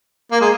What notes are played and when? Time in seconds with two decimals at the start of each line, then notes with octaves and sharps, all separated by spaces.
0.32 A#3
0.41 G#3